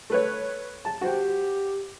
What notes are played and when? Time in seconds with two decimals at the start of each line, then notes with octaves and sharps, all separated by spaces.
0.10 A3 B4 C#5
0.85 A5
1.01 F#4 G4 C5 G5